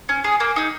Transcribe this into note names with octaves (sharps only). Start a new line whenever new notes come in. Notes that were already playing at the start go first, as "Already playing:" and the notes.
C#4
G#4
A#3
D#4 G#4